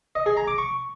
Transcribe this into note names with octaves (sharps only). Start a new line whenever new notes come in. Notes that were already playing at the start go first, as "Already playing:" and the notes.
D#5
G#4
A#5
D6
C#6